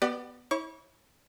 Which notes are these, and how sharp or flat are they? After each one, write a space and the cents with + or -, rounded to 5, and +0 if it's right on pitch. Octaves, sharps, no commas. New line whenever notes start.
B3 +0 G4 -25 D5 +25
E4 -30 C#5 -30 C#6 +40